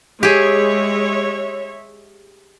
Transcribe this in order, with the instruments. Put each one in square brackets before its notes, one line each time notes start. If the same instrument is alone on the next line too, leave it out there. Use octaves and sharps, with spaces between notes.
[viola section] G#3 C#5 E5 [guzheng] G4 G#4